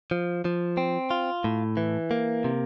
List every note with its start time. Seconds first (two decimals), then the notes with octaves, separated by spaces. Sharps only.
0.11 F3
0.45 F3
0.77 C4
1.11 F4
1.44 A2
1.77 E3
2.11 A#3
2.44 C3